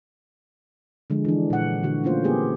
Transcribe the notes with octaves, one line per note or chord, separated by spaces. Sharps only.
D3 F3 G#3
E3 D4
A#2 F#5
D3 F#4
A3 A#3 C#4 F4 C5
A#3 B3 G4 G#4